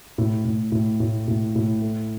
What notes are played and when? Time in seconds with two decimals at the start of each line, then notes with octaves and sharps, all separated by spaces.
0.18 A2
0.45 A2
0.72 A2
1.00 A2
1.28 A2
1.56 A2
1.82 A3